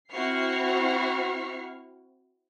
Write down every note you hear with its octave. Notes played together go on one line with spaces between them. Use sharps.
C4 E4 F#4 C#6 F6 C7